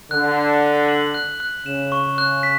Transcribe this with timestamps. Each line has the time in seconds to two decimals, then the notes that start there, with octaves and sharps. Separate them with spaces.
0.11 D3 F#6
0.37 F#6
0.63 B6
0.89 F#7
1.14 F#6
1.40 F#6
1.66 C#3 E7
1.92 C#6
2.18 F#6
2.43 B6